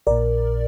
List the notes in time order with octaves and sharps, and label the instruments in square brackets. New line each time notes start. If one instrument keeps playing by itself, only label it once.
[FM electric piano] A#1 A#2 A#4 D5